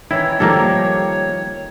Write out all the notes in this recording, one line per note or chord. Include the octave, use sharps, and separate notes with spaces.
D#3 E3 E4 C#5
D#3 F3 G3 A#3 G4 A4 A#4